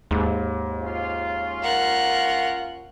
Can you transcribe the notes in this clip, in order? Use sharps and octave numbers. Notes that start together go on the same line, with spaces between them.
D#2 G#2
C#4 F4
A#4 F#5